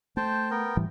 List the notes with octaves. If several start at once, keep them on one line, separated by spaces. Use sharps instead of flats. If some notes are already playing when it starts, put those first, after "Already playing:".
A3 C5 G5 A5
B3 A#4 G5
A2 E3 G3